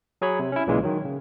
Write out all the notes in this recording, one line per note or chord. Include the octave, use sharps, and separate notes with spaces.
F#3 G#4 C#5 B5
C3
C#4 E4
B1 A#2 C#3 E3 G#3
D#3 F#3
C#3